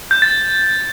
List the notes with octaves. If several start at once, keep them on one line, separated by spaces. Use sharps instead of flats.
G6
A6